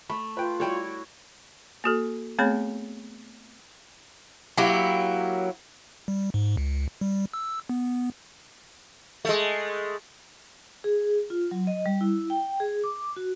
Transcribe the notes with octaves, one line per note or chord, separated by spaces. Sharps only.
A3 B5
F4 B4 G5
G3 E4 F#4 C#5 G5
A#3 F#4 A4
A3 B3 C4 G#4 C#5 B5
F#3 A#3 E4 G4
G3
G#2
C#2
G3
E6
B3
G#3 A3
G#4
F4
F#3
D#5
G3
E4
G5
G#4
D6
F#4